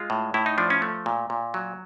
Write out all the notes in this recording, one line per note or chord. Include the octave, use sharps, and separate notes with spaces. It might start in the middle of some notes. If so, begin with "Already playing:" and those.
Already playing: G#3 F4
A2
A2 E4
D#4
F3 D4
C#4
A3
A#2
A#2
F#3